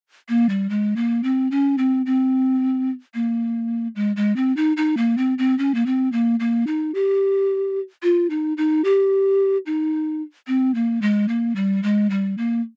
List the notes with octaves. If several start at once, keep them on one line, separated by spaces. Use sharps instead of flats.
A#3
G3
G#3
A#3
C4
C#4
C4
C4
A#3
G#3
G#3
C4
D#4
D#4
A#3
C4
C4
C#4
A#3
C4
A#3
A#3
D#4
G4
F4
D#4
D#4
G4
D#4
C4
A#3
G#3
A#3
G3
G#3
G3
A#3